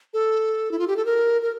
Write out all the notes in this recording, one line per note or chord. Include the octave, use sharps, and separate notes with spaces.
A4
E4
F4
G4
A4
A#4
A#4